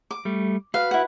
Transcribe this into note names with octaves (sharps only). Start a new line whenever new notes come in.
D6
G3 A3
F#4 B4 F5
E4 F#5